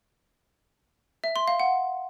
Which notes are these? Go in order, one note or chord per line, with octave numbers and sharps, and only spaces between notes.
E5
C6
F5
F#5